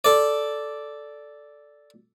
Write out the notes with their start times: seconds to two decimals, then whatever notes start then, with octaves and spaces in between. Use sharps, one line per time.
0.05 A4 D5